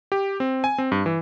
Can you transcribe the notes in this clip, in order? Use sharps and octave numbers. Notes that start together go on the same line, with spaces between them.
G4
C4
G#5
C4
G2
E3